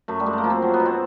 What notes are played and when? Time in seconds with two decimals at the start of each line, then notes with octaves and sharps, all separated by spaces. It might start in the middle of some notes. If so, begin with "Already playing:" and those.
0.08 F#2 A3
0.20 G3
0.26 F#2 G#3
0.33 A3 A#3
0.44 F3
0.50 C4
0.62 F#3
0.74 B3
0.80 B2
0.86 C4